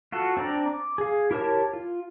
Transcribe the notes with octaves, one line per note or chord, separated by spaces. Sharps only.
F4 F#4 A4
C4 D4 D5 A#5
D6
G#4 F5
E4 G4 A#4 C#5 A5
F4